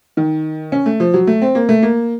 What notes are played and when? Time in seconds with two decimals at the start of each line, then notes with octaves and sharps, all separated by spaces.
0.17 D#3
0.72 C#4
0.86 A3
1.00 F3
1.14 F#3
1.27 A3
1.42 C4
1.55 A#3
1.69 A3
1.83 A#3